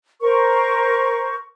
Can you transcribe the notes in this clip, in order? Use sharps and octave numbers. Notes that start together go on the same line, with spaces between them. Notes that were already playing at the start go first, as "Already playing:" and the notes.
A#4 C5 C#6